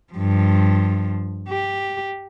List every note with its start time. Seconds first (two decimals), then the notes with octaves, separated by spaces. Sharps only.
0.13 G2 F3
1.49 G4